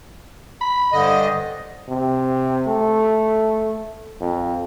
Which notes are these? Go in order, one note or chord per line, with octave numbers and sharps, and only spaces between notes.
B5
G2 D3 D#5
C5
C3
A3
F2